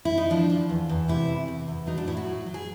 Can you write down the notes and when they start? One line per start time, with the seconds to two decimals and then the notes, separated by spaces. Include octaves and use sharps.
0.05 E4
0.17 D#4
0.30 F3 D4
0.50 F3
0.70 E2
0.89 E2
1.08 C3 E4
1.29 E2
1.48 E2
1.68 E2
1.87 F#3 D#4
1.98 D4
2.07 A2 E4
2.17 F#4
2.26 F#3
2.46 F#3
2.54 G#4